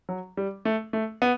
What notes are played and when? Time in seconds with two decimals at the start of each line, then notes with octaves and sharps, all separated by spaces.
0.09 F#3
0.37 G3
0.65 A3
0.93 A3
1.22 B3